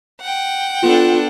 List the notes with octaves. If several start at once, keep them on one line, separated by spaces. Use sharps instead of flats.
F#5 G5
B3 D4 F4 A4